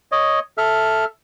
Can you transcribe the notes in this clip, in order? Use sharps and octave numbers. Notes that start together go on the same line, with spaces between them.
C#5 D#5
A4 E5 F6